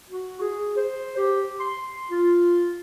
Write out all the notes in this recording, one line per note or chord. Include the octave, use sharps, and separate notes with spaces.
F#4
G#4
C5
G4
C6
F4